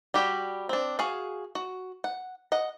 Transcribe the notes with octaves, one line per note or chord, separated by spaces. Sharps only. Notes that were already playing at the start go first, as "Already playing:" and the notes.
G3 F#4 G4
C4 D4
F#4 G#4 F5
F#4
F#5
D#5 F#5